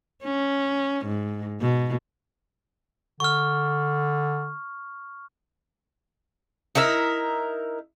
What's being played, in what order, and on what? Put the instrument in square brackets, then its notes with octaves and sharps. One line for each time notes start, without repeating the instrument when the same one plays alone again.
[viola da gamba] C#4
G#2
B2
[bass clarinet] D3 [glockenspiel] C#6 F6
[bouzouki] D#4 E4 A#4 E5